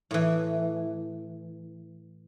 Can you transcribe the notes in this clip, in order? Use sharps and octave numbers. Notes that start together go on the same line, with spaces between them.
A2 E3